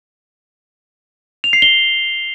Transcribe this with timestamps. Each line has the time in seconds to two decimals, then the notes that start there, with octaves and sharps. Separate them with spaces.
1.44 F7
1.53 C7
1.62 G7